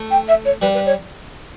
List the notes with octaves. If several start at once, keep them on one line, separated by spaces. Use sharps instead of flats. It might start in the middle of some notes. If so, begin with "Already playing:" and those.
Already playing: A3
G5
E5
C#5
G3 B4
B4
C#5